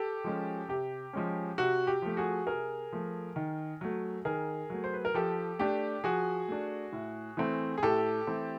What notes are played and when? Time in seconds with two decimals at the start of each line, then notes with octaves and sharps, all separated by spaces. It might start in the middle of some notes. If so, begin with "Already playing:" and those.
Already playing: G4 A4
0.24 F3 G#3 C#4
0.68 C3 G4
1.13 F3 G#3 C#4
1.58 C3 F#4
1.87 G4
2.02 F3 A3
2.17 F#4 G#4
2.47 C3 G#4 A#4
2.92 F3 A3
3.36 D#3
3.81 F#3 A3
4.25 D#3 G#4 A#4
4.70 F#3 A3
4.84 C5
4.94 B4
5.05 A#4
5.14 F3 G4 A4
5.59 A3 D4 G4
6.04 F3 F#4 G#4
6.49 A3 D4
6.93 A2
7.37 E3 A3 C4
7.78 G#4
7.83 A2 G4 A4
8.27 E3 A3 C4